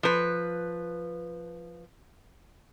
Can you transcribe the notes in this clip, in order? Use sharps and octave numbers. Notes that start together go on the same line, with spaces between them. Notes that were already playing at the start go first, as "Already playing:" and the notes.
F3 B4